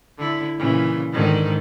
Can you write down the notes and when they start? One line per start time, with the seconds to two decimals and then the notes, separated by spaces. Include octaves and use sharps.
0.17 D3 E4
0.57 A#2 C#3 E3
1.12 G#2 D3 D#3